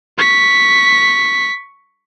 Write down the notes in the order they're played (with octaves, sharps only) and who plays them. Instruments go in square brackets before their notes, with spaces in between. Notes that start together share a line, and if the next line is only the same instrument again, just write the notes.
[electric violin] C#6 B6